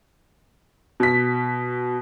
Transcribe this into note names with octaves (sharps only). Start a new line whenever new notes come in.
B2 B6